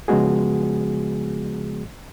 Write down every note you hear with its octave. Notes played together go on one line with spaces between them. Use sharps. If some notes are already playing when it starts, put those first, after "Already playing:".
C#3 F3 G#3 B3 F#4 G#4